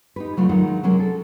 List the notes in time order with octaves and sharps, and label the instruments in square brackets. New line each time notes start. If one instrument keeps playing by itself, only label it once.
[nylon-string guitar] D#4 G4 B4
C#3 F#3 A3 F4
D#3 F#3 G#3 D4 D#4 F#5
C3 F#3 G#3 C#4 G#4 A#4
A4